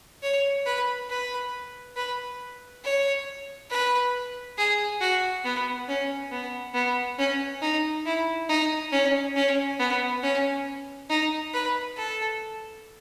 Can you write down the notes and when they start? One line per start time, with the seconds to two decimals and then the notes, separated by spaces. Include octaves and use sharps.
0.23 C#5
0.66 B4
1.10 B4
1.96 B4
2.84 C#5
3.70 B4
4.58 G#4
5.01 F#4
5.45 B3
5.88 C#4
6.32 B3
6.74 B3
7.19 C#4
7.62 D#4
8.06 E4
8.49 D#4
8.92 C#4
9.36 C#4
9.79 B3
10.23 C#4
11.10 D#4
11.54 B4
11.97 A4